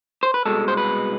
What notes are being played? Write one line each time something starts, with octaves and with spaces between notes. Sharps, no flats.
C5
B4
C2 B2 G#3 A4
C5
B4